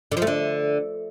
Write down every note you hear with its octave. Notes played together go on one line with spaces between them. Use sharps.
D3
F3
A3
D3